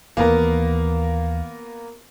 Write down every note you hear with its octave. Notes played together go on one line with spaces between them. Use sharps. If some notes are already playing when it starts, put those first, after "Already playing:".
D#2 E3 A#3 B3 A#4